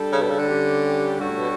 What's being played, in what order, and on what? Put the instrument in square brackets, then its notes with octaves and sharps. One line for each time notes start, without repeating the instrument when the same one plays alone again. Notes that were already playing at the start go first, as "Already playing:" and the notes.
Already playing: [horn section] G3 D4 A4
[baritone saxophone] C#3
B2
C#3
D3
[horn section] G3 C#4 G4
[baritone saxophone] G2 [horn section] G3 D4 F#4 A4 C#5
[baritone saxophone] A2
B2